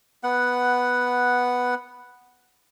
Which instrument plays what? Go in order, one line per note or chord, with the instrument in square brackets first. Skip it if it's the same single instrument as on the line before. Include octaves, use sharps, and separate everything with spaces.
[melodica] B3 F#5